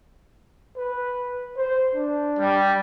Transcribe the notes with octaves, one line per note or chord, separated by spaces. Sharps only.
B4
C5
D4
G3